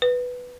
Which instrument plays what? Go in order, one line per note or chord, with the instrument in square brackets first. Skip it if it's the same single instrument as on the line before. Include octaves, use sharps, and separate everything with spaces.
[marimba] B4